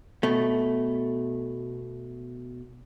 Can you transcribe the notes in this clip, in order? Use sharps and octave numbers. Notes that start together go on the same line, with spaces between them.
B2 A3